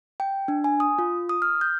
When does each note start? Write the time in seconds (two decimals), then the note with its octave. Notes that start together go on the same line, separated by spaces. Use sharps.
0.20 G5
0.48 D4
0.64 G#5
0.80 D#6
0.98 F4
1.29 D#6
1.42 F6
1.61 G6